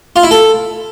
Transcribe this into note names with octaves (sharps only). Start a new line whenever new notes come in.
F4
E4
A4